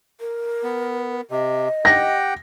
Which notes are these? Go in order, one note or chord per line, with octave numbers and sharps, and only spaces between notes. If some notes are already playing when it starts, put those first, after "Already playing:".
A#4
B3
C3 D#5
G4 F#5 G5 A#6